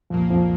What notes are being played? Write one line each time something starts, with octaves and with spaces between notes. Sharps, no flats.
C2 F2 A#2 F3 A#3
F2 F3